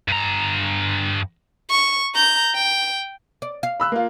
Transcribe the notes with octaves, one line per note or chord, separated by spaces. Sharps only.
G2 A#5
C#6
A#5 G6
G5
D5
F5
B5 E6 F#6
A#3 F4